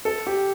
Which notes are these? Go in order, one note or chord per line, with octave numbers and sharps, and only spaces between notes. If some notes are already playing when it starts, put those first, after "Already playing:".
A4
G4